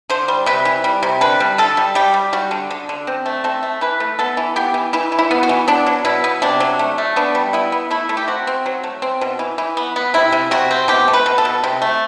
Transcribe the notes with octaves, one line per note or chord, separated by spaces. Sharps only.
D3 C5
G3
C3 B4
E3
G3
C3
D3 B4
G3
D3 A4
G3
G3 G4
G3
G3 F#4
D3
D3
D3
C4
A3
C4 A4
A3
E3 B4
A3
B3 A4
E3
B3 G4
E3
E3 E4
E3
E4
B3
F#4
E3
B3 D4
F#3
B2 E4
B3
C3 D4
F#3
A3
A3
B3 D4
G3
B3 E4
B3
A3 E4
A3
G4
C4 F#4
C4
F#3
A3
C4
B2
E3
E3
B3
B3
C3 E4
C3
C3 F#4
C4
B2 G4
A3
B4
B2
A4
B2
C3
A3